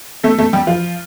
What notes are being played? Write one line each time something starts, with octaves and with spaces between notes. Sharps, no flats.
A3 A4
A3 A4
G3 G4
F3 F4